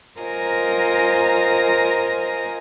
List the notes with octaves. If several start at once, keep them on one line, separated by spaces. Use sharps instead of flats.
F4 A#4 C5 D#5 G#5 A#5